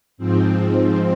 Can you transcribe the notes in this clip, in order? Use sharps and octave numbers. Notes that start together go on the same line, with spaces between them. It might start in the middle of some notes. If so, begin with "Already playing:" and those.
G#2 F3 C4